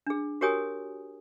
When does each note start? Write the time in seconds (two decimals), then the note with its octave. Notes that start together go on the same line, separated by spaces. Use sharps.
0.07 D4 G#4
0.41 F#4 G4 A#4 C#5 G#5 D#6